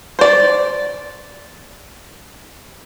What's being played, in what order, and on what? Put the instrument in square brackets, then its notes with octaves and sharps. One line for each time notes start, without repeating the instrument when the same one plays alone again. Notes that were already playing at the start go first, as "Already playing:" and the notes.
[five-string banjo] C5 D5